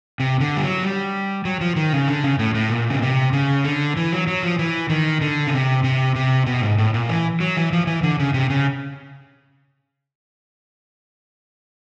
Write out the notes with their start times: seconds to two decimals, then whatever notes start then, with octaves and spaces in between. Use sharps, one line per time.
0.20 C3
0.40 D3
0.57 G3
0.62 F#3
0.83 G3
1.45 F#3
1.61 F3
1.76 D#3
1.93 C#3
2.08 D3
2.24 C#3
2.39 A2
2.55 A2
2.70 A#2
2.90 C#3
3.02 C3
3.33 C#3
3.64 D3
3.97 E3
4.12 F#3
4.27 F#3
4.43 F3
4.59 E3
4.90 D#3
5.21 D3
5.47 C#3
5.53 C3
5.84 C3
6.15 C3
6.46 B2
6.62 G#2
6.78 A2
6.94 A#2
7.09 E3
7.40 F#3
7.57 E3
7.73 F3
7.87 E3
8.03 D3
8.19 C#3
8.34 C3
8.50 C#3